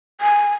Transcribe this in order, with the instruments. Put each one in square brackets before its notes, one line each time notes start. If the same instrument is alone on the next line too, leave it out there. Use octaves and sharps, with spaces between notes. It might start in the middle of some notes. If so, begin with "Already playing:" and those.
[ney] G#5